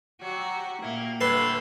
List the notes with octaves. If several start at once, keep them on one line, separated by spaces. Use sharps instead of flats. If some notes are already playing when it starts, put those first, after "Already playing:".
F#3 F#4 G4
A#2 A#3 E4 G4
A2 D3 A4 B4 C6